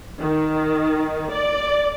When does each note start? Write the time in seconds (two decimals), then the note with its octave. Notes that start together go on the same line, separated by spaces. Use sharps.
0.20 D#3
1.32 D5